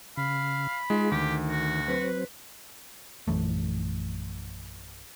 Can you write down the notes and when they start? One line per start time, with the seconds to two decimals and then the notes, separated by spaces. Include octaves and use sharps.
0.17 C#3 F5 B5
0.90 G#3 D#4 F4 G#4
1.12 D2 D#3 G4
1.50 F#4
1.88 F#3 C4 B4 C5
3.28 A#1 F#2 E3 A3